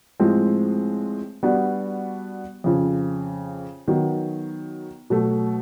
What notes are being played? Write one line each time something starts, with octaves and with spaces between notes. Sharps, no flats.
A2 F3 G#3 C4
G3 B3 D4 F#4
F2 C#3 F3
D#3 F#3 B3
B2 F#3 A3